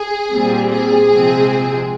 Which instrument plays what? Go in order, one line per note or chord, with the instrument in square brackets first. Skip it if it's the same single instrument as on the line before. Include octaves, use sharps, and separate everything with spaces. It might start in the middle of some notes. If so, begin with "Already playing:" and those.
Already playing: [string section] G#4
A#2 G3 C4
G#4
C3 F3 G#3 C4